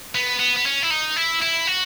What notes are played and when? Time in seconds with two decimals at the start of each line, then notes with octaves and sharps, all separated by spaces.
0.15 B3
0.39 B3
0.57 B3
0.66 C#4
0.82 E4
0.90 D#4
1.16 E4
1.42 E4
1.67 F#4